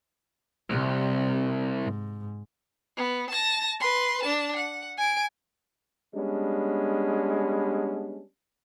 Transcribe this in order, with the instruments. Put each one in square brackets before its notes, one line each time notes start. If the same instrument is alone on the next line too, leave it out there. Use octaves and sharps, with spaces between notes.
[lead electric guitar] C2 [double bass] C3
[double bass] G#2
[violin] B3
A5 A#6
B4 C6
D4 A5
F#5
G#5 D7
[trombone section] G3 G#3 B3 C#4 D4